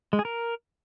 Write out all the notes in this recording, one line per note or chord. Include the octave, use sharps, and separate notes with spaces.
G#3
G#4
A#4